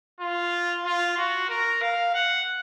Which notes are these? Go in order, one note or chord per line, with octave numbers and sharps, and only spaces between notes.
F4
F4
F#4
A#4
F5
F#5